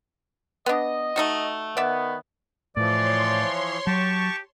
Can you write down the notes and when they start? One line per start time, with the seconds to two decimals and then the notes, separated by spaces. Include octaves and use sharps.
0.66 B3 D4 D#5
1.16 A3 D#4 F#4
1.77 D#3 B3 D5 E5
2.77 A2 E3 F3 C#5 D5 C6
3.87 F#3 G4 A5 C#6